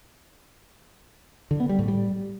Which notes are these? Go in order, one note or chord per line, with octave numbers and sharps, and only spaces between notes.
D3
B3
G3
A2
G3